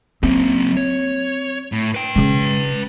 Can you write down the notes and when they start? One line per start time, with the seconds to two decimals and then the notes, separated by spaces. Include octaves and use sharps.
0.23 F#3 A#3 C4
0.77 C#5
1.72 A2
1.95 B4 G5
2.16 C#3 G#3